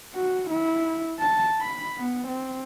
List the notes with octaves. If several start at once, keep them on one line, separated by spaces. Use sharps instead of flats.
F#4
E4
A5
B5
B3
C4